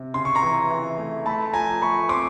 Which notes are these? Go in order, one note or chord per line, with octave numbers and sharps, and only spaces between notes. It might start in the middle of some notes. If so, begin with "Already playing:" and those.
Already playing: C3
C#3 C6
C#6
A#5 C6
E3
E3
A3
A3 A5 B5
F3 G#5 A#5
A3 B5 C#6
C4 C6 D6